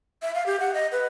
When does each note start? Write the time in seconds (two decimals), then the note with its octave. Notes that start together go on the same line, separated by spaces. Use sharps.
0.22 E5
0.35 F5
0.46 G4
0.60 F#5
0.74 D#5
0.92 B4